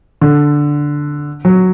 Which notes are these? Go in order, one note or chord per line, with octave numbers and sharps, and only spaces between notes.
D3
F#3